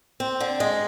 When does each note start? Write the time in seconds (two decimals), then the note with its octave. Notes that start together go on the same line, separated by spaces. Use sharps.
0.20 C4
0.40 D3
0.60 G#3